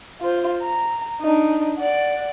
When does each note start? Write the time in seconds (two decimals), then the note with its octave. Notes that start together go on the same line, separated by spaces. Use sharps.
0.21 F4 C5
0.61 A#5
1.21 D4 D#4
1.79 D5 F#5